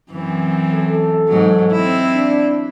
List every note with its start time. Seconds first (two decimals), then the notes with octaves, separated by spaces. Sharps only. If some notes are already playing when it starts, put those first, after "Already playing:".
0.12 F#2 E3 C4
0.73 A4
1.29 G#2 F#3
1.71 C4 E4
2.14 D4